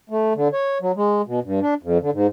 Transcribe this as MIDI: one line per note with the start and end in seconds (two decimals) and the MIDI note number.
0.10 0.33 57
0.35 0.48 50
0.53 0.78 73
0.81 0.92 54
0.96 1.22 56
1.27 1.40 47
1.44 1.60 43
1.62 1.74 62
1.83 1.98 41
2.01 2.10 50
2.13 2.27 44